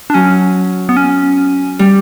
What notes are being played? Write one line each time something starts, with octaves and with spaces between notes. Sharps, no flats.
D4
F#3 C#4
B3
C#4
G3